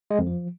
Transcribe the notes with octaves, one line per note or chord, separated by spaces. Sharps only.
G#3
F2
F3